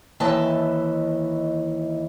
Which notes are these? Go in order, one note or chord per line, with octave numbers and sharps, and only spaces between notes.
D#2 E3 D#5 E5 A5